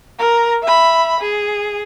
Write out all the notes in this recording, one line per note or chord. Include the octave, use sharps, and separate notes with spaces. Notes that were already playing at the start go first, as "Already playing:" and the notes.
A#4 A#5
E5 B5
G#4